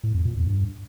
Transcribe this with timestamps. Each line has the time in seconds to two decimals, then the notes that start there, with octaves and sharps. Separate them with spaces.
0.04 A2
0.14 F2
0.25 A#2
0.36 E2
0.47 G2